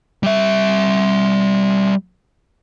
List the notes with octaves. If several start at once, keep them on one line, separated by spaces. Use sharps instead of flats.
G3 E5